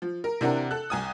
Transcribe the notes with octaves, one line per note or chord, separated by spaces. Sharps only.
F3
A#4
C3 E3 D4 A#4 F#5
A4 F#6
C2 G#5 D#6